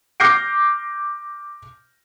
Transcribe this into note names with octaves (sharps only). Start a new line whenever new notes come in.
D6 F6 G6 A#6 C7 D7